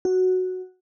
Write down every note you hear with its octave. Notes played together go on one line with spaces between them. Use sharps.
F#4